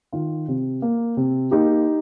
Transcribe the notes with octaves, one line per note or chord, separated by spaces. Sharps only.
D#3 F4
C3
A#3
C3
A#3 D#4 G4